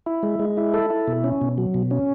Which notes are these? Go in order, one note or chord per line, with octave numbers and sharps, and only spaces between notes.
E4
G#3
G#3
E4
A4
E4
B2
C#4
B2
F#3
B2
C#4